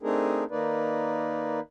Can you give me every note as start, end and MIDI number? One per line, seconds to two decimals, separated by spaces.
0.03 0.44 57
0.03 0.44 60
0.03 0.44 62
0.03 0.44 63
0.03 0.44 68
0.03 0.44 70
0.51 1.60 51
0.51 1.60 58
0.51 1.60 63
0.51 1.60 71
0.51 1.60 74